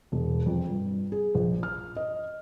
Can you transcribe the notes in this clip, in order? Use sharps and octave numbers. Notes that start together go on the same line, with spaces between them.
E1
F2
G2
G#4
A#1
F6
D#5